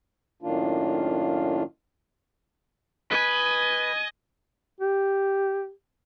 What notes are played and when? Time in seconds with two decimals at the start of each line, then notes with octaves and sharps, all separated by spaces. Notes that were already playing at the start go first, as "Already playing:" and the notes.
0.43 F#2 A2 D#3 A#3 D4 F4
3.11 B4 D#5 G#5
4.80 G4